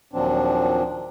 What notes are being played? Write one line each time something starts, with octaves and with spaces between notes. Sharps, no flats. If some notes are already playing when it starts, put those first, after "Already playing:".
D#2 A#2 F3 F#3 C4 D4